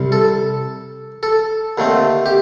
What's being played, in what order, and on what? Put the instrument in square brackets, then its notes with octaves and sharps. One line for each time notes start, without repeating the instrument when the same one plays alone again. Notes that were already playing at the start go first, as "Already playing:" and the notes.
Already playing: [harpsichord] C2 C3 G3
A4
A4
D#2 D3 A3 C4
G4